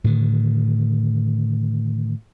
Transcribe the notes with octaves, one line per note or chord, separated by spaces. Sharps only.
A2 D3 D#3